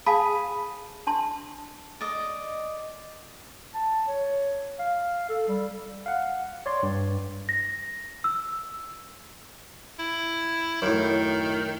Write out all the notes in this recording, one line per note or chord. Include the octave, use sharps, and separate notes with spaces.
G#4 F5 A5 B5
D4 A5 C6
D5 D#5
A5
C#5
F5
A4
G3
F5 F#5
C#5 D5 C6
G2
A#6
E6
E4
F#2 A2 D#3